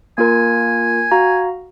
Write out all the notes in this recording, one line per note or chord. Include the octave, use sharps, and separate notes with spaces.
A#3 F4 A#4 G#5
F#4 F5 A#5